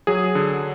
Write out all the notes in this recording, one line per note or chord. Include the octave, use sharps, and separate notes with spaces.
F#3 G#4
D3